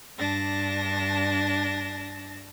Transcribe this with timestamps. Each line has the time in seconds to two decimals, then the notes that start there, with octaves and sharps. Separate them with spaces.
0.17 G2 D4 A5 A#6